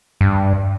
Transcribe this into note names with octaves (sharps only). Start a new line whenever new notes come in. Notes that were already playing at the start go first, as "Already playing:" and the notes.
G2